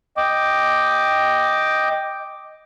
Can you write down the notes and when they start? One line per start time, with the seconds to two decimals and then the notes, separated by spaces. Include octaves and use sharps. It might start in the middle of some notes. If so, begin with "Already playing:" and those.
0.17 D#5 G5 D6